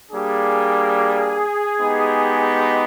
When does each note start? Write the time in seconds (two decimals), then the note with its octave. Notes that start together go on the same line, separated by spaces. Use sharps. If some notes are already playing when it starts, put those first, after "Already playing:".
0.11 G3 A#3 D4 G#4
1.80 G#3 B3 D#4 G4